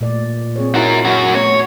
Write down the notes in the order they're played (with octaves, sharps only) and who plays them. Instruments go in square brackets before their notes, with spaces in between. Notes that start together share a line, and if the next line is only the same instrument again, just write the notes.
[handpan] A#2 A3 D5
C4 G#4 C#5
[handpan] D#4 E4 [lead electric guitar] F#4 A#4
[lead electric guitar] F#2 F#4
[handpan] A3 B3 C#4 [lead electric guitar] C#5